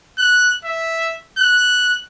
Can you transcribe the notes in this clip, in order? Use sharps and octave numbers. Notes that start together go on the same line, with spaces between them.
F#6
E5
F#6